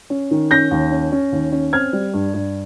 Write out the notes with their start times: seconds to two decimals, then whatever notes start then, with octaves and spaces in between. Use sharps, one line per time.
0.10 C#4
0.31 D#3
0.51 C#4 G6 A#6
0.71 D#2
0.92 C#4
1.12 C#4
1.32 D#2
1.52 C#4
1.73 C4 F6 G#6
1.93 G3
2.14 G2
2.34 G2